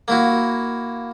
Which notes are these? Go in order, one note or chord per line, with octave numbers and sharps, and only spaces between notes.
A#3 E4 F#4